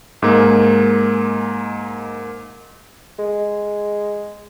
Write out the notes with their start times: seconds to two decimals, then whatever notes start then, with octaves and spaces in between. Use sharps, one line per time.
0.22 G#2 G#3 A#3
3.19 G#3